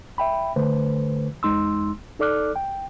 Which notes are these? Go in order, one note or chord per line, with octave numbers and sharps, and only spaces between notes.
E5 G5 B5
D3 A3 B4 C5
E2 G#3 D#4 C6 E6
D#4 A4 D5 D6 F6 F#6
G5